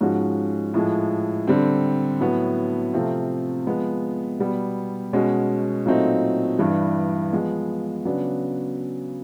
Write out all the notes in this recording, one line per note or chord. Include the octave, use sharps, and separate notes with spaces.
G#2 F3 G#3 C#4 F#4
A2 F3 G#3
D3 G3 C4
A2 F#3 B3
C3 F3 A3 C4 F4
F3 G#3 B3
B2 G3 B3
B2 G#3 C#4 F#4
A#2 F#3 A3 C4 D#4
G2 E3 G3
F3 G#3 B3
C#3 F#3 B3 D4